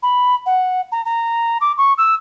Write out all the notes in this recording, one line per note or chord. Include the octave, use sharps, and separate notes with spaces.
B5
F#5
A#5
A#5
D6
C#6
E6